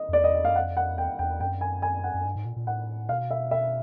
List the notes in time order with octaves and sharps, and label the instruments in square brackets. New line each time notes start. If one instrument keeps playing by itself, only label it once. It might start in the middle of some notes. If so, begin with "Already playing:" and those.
Already playing: [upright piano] D#5
[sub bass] F2
[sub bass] E2 [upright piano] D5
[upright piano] D#5
D#5
[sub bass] F#2 [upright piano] F5
[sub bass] F2 [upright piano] F#5
[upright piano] F#5
[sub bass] E2 [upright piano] G5
[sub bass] E2 [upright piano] G5
[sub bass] F#2 [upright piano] G5
[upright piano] G#5
G#5
F#5
[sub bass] F#2
G2
G#2
A#2
A#2
[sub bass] A2 [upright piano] F#5
[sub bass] B2 [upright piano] F5
[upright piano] E5
E5